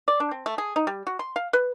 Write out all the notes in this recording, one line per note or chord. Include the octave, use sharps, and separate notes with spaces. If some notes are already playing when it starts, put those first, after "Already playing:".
D5
D4
C4
A3
G#4
D#4
G3
F#4
C6
F5
B4